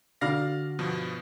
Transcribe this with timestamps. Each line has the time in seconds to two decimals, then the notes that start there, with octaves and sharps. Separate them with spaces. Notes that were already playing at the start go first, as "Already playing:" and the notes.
0.21 D3 F#4 D5 F5 F6 A#6
0.79 G2 B2 F3